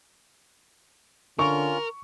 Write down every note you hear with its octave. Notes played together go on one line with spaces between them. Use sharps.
D3 C#4 F4 A#4 C#6